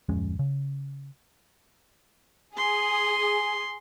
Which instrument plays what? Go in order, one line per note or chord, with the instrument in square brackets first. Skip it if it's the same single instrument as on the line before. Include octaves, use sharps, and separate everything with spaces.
[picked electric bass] D1 F2 G#3 C#4
C#3
[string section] G#4 [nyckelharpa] C6